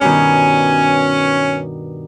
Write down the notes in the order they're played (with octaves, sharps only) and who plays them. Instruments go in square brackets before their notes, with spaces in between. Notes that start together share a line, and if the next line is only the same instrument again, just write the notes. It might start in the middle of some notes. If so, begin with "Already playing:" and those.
[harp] G2 B2 D#3 [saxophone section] C#4 [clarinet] G#5